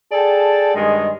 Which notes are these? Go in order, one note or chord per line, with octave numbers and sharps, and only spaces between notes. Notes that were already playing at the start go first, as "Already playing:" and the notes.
G#4 A4 D5 G5 A5
G2 D#3 G#3